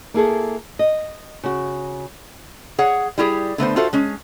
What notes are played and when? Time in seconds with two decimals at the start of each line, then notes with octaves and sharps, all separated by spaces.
0.14 A#3 E4 G#4 A4
0.79 D#5
1.43 C#3 F#4
2.79 G#4 C#5 F#5
3.18 G3 E4 G4 G#4
3.58 D3 A3 B3 C5
3.76 F4 F#4 A4 C5 E5
3.93 G#3 C#4